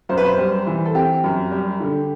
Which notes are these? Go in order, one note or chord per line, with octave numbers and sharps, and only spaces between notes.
F#2 C5
B4
C5
G3
E3
A4
C4 G4
F#2
G3
D3